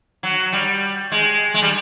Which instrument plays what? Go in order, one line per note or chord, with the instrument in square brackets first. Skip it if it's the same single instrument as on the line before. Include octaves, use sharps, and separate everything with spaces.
[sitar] F#3
G3
G#3
G#3
G3